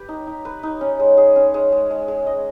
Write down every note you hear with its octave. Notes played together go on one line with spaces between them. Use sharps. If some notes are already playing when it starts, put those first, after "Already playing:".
Already playing: G4 B4
D#4
D#4
B4
D#4
C#4
G#3
G#4
C#4
G#3
G#3
G#3
G#3
D#5